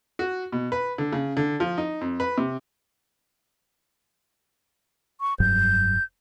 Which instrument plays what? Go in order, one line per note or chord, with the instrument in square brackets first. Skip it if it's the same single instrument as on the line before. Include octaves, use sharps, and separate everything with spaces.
[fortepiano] F#4
B2
B4
D3
C#3
D3
F3
D#4
F2
B4
C3
[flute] C#6
[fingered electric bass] F1 G2 F#3 [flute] G6